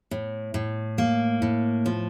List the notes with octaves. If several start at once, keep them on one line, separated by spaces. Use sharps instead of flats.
A2
A2
A#3
A2
F3